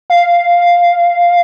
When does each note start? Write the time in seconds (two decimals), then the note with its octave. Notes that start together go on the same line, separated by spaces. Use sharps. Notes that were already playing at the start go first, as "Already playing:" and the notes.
0.10 F5